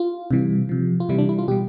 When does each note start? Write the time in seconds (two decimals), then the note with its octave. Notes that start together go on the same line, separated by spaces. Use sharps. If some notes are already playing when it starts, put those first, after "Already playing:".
Already playing: F4
0.31 C3 E3 G3
0.69 C3 F3
1.00 F4
1.09 C3 E3 G3 E4
1.19 D4
1.29 E4
1.39 F4
1.48 B2 G3 G4